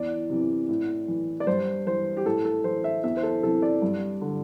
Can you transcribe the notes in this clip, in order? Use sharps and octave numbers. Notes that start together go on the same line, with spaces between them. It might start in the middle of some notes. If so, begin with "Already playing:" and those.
Already playing: E2 D5
C3 E3
A2
E3
D5
G2 C5
E3 C5
G4
A2 A4
A4
E3 C5
E5
E2 E5
C5
A4
C3 E3 A4
D5
G2
D3